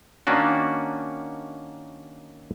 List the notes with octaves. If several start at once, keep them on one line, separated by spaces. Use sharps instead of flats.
D#3 A#3 C#4 D4 F#4